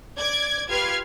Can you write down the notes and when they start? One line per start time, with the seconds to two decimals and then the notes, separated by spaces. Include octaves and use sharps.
0.18 D5 D6 G#6
0.68 F4 G4 B4 F6 G#6 C7